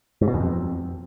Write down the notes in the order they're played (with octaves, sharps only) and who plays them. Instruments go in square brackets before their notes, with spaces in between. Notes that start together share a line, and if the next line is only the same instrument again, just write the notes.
[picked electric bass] G#2
B2
E2
F2